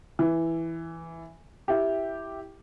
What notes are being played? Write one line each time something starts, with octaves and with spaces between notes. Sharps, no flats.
E3
E4 G4